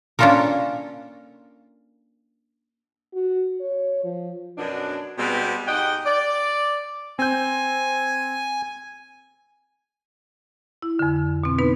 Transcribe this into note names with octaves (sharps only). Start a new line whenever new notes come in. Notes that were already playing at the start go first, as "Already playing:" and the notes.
A#3 C#4 D4 F4 A4 A#4
F#4
C#5
F3
F#2 B2 D4
B2 G3 G#3 B3 C4
G#2 G4 D#5 F#5 G5
D5
C4 G#5 G6
E4
F2 D3
B2 C4
B3 D#4 B4